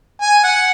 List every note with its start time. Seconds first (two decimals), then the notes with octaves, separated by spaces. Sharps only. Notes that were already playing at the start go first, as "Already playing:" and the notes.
0.21 G#5
0.44 F#5